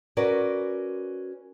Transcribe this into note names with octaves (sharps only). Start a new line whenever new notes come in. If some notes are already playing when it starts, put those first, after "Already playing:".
C#4 F#4 A#4 B4 D5